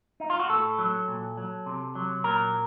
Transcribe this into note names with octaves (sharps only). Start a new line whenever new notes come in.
D#4
F4
F#4
A2 A4
F#3
A#2
F#3
C3
F#3
A#2 A#4